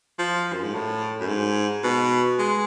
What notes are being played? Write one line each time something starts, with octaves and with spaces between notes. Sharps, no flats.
F3
F#2
G#2
A2
F#2
G#2
B2
G#3